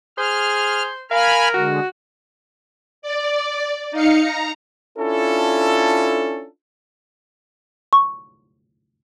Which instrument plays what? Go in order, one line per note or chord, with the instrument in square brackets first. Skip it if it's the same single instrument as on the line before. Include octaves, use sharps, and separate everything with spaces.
[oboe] G#4 [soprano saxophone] C5 [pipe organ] F6
[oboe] A#4 [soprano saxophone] F5 [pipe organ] G#5 B5 F6
[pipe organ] D3 G#3 [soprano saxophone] F#4
[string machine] D5
D#4 F5 C#7
A#5
[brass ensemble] C#4 D4 E4 F4 A4
[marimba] C#6